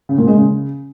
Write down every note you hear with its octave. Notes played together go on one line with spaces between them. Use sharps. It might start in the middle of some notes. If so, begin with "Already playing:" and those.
C#3
A#2
G#3
C#3